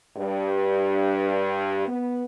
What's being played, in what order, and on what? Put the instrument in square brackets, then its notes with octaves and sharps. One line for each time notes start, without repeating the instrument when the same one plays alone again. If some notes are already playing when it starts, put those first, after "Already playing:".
[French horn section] G2
B3